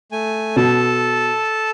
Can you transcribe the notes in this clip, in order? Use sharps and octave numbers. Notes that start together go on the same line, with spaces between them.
A3 G#5
B2 A4 A5